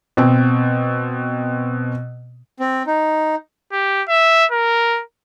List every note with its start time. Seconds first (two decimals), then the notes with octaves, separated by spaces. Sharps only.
0.17 B2 C4
2.60 C4
2.87 D#4
3.72 G4
4.09 E5
4.52 A#4